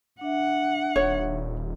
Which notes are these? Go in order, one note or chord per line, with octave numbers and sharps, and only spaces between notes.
D4 E5 F#5
D#1 C#5